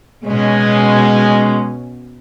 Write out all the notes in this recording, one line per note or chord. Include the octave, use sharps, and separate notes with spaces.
B2 G#3 C#4